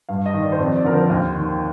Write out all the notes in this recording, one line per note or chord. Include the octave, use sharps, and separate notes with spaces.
G2 F5
D#5
D#3
D5
C5
F2 D5
D5
D3 F3 A#4
C5
D#2
D#3